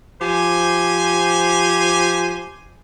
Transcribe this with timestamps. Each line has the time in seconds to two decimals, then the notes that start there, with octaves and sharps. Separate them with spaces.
0.22 F3 G4 C5 G#5